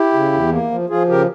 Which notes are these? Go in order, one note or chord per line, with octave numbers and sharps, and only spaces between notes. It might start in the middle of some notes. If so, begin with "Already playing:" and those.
Already playing: E4 G4
C#3
E2
A#3
F3
F3 F4 G#4
C#3 G4 A#4